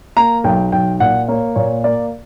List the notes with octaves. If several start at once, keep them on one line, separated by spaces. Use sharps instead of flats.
A#3 A#5
B1 G5
B1 G5
A#2 F#5
A#3 C#5
A#2 C#5
A#3 D5